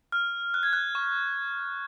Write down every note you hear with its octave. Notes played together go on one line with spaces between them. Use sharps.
F6
F#6
G#6
F#6
C#6